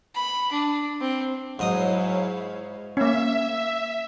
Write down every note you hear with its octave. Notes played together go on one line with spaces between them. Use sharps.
B5
D4
C4
G#2 F#3 G#3 E4 C#5 D#5 F5 D#6
A#3 C#4 E5